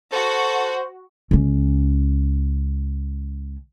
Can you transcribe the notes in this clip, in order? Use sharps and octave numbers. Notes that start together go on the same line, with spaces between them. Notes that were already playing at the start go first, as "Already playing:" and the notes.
F#4 A4 C5
C#2 C#4